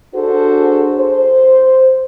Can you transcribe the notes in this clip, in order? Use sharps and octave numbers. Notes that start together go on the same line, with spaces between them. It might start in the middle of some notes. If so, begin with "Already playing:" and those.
D4 F#4 G#4 A4 C5
C5